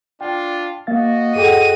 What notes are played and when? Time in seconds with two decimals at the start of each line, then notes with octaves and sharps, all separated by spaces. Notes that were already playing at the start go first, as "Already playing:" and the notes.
0.21 D4 F4 G5
0.87 A#3 F#4 D#5 F5 A6
1.36 F#2 G#4 A4 F#5 G5 D#7